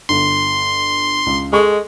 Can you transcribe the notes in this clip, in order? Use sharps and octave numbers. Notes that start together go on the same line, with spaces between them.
G1 C6
C#2
G#3 A4 D#5 C#6